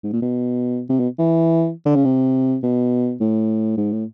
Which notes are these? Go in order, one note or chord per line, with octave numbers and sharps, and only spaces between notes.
G#2
A#2
B2
C3
B2
E3
D3
C#3
C3
B2
A2
G#2
A2